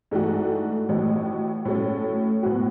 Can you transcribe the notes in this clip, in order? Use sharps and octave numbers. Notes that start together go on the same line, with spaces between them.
G#2 E3 A3 D4 F#4
A1 A2 F#3
A2 F#3 A3 C#4
A2 F#3 B3 F#4